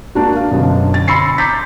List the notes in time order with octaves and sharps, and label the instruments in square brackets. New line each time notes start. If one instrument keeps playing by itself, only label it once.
[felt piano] A#3 D4 F#4
F5
F#2 B2 D3
A6
B5 C6 E6 A#6 C7 C#7
A#5 D6 G6 A6 B6